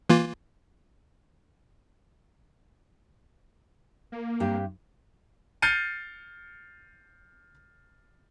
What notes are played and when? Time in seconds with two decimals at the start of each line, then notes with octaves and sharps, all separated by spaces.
0.10 E3 A#3 F4
4.12 A#3
4.40 G2 C4 G4
5.62 F6 G6 A6 C7 C#7 D#7